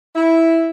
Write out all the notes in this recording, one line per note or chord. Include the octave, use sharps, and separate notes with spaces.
E4